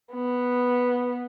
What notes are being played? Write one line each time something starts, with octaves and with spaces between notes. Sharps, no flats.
B3